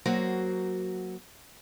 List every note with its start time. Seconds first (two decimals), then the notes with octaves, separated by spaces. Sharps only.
0.06 F#3 A#3 F#4 C5